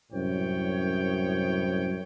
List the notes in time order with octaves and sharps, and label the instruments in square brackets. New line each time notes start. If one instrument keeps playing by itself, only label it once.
[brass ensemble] C2 F#2 A2 C5 C#5 G5